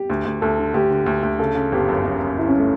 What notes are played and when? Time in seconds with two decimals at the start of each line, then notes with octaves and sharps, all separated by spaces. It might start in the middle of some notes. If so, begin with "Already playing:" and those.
Already playing: G4
0.10 D2
0.25 D2
0.41 D2 A4
0.59 D3
0.74 D2 G4
0.90 D3
1.06 D2
1.23 D2
1.39 C#3 A4
1.55 C#3
1.72 G1 G4
1.89 F#2
2.05 F#2
2.20 F#2
2.37 G1 E4
2.48 C#4
2.59 A3